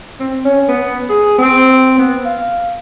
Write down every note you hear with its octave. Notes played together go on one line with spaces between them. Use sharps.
C4
C#4
B3
G#4
C4
B3
F5